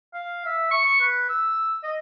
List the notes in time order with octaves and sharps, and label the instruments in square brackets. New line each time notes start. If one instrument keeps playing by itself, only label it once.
[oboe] F5
E5
C#6
B4
E6
D#5